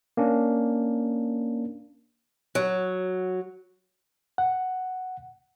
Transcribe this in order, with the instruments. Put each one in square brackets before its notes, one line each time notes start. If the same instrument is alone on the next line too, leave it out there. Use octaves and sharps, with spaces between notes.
[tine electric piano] A#3 C#4 D4
[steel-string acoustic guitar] F#3
[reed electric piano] F#5